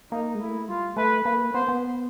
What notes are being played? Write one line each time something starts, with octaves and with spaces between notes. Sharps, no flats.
A#3 D#4
G#3
A3 E4
G3 F4
A3 B4
A#3 B4
B3 C5
B3